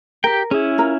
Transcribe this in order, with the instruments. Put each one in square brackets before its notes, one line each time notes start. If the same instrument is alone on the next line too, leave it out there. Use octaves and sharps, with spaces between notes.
[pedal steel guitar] G4 G5 [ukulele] A#4
[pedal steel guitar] C#4 E4 [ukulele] G#4
[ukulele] F4 A#4 A#5